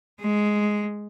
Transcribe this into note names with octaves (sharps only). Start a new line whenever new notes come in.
G#3